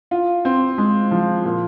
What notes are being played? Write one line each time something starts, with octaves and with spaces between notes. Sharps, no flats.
F4
C4
G#3
F3
A#2